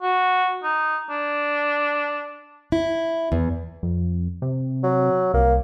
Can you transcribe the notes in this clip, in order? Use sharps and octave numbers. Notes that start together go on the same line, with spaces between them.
F#4
D#4
D4
E4
E2
F2
C3
F#3
C2 A#3